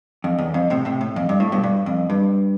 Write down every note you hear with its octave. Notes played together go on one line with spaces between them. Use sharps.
F2
E2
F2
A2 C3
A2 C3
A2
F2
G2
A2
G2 B2
G2
F2
G2